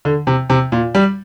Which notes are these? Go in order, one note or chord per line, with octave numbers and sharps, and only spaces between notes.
D3
C3
C3
A#2
G3